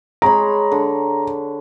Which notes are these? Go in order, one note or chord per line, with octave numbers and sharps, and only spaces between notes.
G#3 C#5 A#5 B5
D3